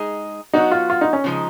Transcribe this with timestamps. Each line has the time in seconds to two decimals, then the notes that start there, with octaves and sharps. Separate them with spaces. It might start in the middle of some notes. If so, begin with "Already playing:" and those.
Already playing: G#3 D#4 G#4
0.53 F#3 B3 D#4 F#4
0.71 F4
0.90 F4
1.01 D#4
1.13 C#4
1.24 C#3 F3 G#3 D#4